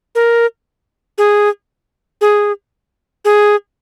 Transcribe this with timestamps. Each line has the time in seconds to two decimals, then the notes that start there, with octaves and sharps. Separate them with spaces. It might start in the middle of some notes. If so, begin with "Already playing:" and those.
0.15 A#4
1.18 G#4
2.21 G#4
3.25 G#4